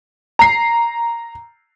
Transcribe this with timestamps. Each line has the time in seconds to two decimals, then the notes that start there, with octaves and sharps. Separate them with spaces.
0.39 A#5 C7